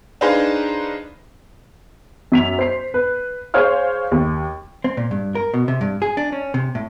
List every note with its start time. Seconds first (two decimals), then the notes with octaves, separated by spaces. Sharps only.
0.21 D4 D#4 G#4 B4 C5 F5
2.32 F#2 B6 F7
2.59 C5 C7
2.94 B4
3.54 G#4 C5 C#5 F5 F6
4.12 D#2
4.84 C4
4.97 A#2
5.11 G2
5.35 A#4
5.54 B2
5.68 C3
5.81 G2
6.02 G#4
6.17 D4
6.32 C#4
6.54 C3
6.75 A2